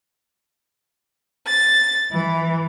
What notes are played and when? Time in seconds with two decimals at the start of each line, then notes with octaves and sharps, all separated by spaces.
1.47 A6
2.11 E3